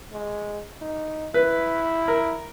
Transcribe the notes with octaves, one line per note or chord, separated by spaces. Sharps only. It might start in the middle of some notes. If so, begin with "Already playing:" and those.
G#3
D#4
E4 B4
A#4